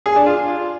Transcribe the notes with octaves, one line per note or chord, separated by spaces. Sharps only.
G#4
D4
F4